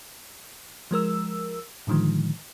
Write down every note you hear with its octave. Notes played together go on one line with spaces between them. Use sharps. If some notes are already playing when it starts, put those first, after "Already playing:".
F3 G#3 A#4 E6
A2 D3 D#3 F3 G#3